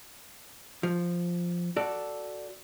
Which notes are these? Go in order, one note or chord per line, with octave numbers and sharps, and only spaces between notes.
F3
F#4 A4 D5